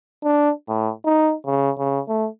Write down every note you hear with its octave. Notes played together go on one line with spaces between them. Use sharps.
D4
A2
D#4
C#3
C#3
A3